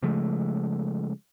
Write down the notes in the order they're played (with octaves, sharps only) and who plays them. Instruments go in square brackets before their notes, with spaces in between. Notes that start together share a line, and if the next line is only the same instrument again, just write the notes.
[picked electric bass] C#3 F3 G#3 A3